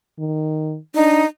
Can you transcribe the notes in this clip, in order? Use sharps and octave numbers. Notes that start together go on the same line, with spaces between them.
D#3
D4 D#4